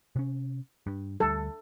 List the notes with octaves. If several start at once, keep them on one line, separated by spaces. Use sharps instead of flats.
C3 C#4
G2
D2 G3 A4